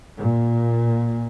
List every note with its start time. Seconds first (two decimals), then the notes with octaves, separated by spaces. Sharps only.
0.19 A#2